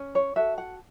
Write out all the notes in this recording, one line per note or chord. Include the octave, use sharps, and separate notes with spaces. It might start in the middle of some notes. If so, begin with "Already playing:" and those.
Already playing: C#4
C#5
F#4 A4 E5
F#5